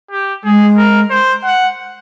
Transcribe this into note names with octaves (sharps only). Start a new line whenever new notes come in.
G4
G#3 G#4
A#4
C5
F#5